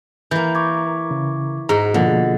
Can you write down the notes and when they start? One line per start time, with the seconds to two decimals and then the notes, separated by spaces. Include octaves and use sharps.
0.31 E3 A#3 G6
0.55 C#6 D6 G#6
1.11 C#3
1.69 G#2 F#4 A#5
1.94 B2 D3 F3 A#3 F4 D#5 F#5